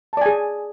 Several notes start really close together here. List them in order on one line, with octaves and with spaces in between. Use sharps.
A5 D5 G#5 G#4